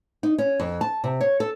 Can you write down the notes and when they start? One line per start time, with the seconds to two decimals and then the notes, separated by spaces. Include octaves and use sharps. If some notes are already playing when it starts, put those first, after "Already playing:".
0.23 D#4
0.38 C#4
0.60 F2
0.81 A5
1.04 C3
1.21 C#5
1.40 A4